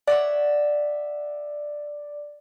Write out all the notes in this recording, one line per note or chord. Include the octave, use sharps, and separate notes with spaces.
C#5 D5 E5 F#5